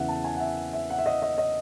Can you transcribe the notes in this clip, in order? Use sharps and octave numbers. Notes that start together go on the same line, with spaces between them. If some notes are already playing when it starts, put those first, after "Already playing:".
Already playing: E2 C#3 E3 E5 F#5
A5
G#5
F#5
E5
E5
F#5
E5
D#5
D#5
D#5